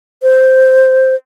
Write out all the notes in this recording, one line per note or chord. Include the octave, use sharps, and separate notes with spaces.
C5